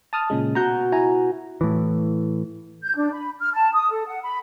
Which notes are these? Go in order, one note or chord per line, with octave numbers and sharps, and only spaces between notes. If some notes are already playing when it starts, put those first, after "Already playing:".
A5 D#6 F6
A#2 C#3 G#3
B2 F#4 A#5 G6
E4 G#5 A#5
A2 E3
G6
D4
B5
F6
A5
D#6
A4
F#5
B5